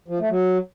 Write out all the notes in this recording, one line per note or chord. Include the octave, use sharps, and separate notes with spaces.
F3
A3
F#3